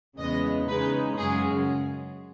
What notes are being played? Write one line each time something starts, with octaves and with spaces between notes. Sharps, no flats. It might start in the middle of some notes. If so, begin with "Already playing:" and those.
E2 C#3 G#3 B3 D#5
C#3 G#3 D#4 B4
F#2 C#3 G#3 C#4 G#4